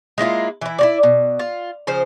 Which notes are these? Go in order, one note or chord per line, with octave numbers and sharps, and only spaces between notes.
G#3 A#3 E4 F4
E3 E4
E4 F#4 D5
B2
F4
C#3 F3 C5